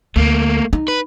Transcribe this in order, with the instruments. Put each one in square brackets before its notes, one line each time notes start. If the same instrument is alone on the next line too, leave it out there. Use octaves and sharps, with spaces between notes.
[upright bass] D2 [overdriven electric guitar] A3 A#3
[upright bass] D#4
[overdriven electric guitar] B4